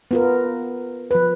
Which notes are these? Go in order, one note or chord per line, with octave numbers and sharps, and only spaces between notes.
B3 F4 A#4
F3 B4